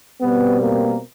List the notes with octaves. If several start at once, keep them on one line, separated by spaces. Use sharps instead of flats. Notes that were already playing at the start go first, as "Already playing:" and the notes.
B2 G3 B3 C4 B4
A#3 A#4